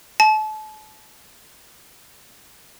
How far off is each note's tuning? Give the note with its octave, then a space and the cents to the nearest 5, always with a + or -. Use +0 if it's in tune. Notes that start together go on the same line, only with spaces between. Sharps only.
A5 -35